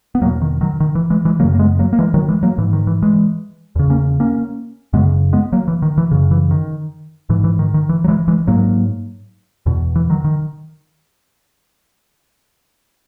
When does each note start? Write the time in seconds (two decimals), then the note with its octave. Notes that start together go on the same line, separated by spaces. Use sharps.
0.15 B3
0.21 E2 F#3 A#3
0.25 B2
0.42 D#3
0.61 D#3 F#3
0.80 D#3
0.95 E3
1.10 E3 G#3
1.25 E3 G#3
1.40 F#2 C#3 F#3 A#3
1.55 A#3
1.59 G#3 B3
1.79 F#3 A#3
1.93 A#3
1.99 E3 G#3
2.14 D#3 F#3
2.29 E3 G#3
2.43 F#3 A#3
2.58 G#2 E3
2.73 D#3
2.87 E3
3.02 E3 G#3
3.76 E2 C#3
3.90 A#3 C#4
4.20 A#3 C#4
4.93 F#2 C#3 G#3 B3
5.33 G#3 B3
5.53 F#3 A#3
5.68 E3
5.82 D#3
5.98 E3
6.11 F#2 C#3
6.31 E3
6.51 D#3
7.30 G#2 E3
7.44 E3
7.59 D#3
7.74 D#3
7.89 E3
8.04 F#3
8.08 E3 G#3
8.28 E3 G#3
8.47 G#2 F#3 A#3
9.66 E2 B2
9.96 E3
10.10 D#3 F#3
10.24 D#3